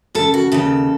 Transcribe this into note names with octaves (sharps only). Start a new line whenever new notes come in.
D#2 C#3 A4
F#4
D#2 C#3 A4